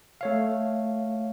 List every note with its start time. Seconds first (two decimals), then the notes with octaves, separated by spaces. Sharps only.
0.21 A3 C#5 F5